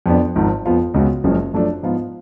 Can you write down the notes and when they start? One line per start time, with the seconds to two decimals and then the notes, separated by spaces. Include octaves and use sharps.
0.06 F2 F3 B3 D4
0.36 G#1 G#2 F3
0.65 F2 F3 B3 F4
0.94 C#2 C#3 G#3 B3 F#4
1.24 F#1 F#2 F3 G#3 C#4
1.54 F#2 F3 A3 D4
1.83 G#2 F3 B3 F4